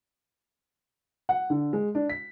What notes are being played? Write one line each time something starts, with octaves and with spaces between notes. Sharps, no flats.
F#5
D3
G#3
D4
B6